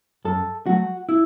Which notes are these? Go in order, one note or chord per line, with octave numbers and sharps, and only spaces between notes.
F#2 A4
F#3 A3 F#4
E4